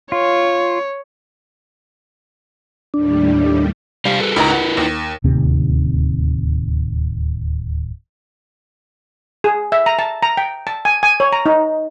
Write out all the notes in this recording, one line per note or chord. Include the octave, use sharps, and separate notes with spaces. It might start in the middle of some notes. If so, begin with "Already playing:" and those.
F4 C#5
D#2 A2 G3 D4
C3 G3 C5 F5
G#4 A4 B4
C#2 D#4 E4 A#4 B4 A#5
F#5
D#2
D1 D#2 C3 C4
G#4
E5
A#5
A5
A#5
G5
A5
G#5
G#5
C#5
A#5
D#4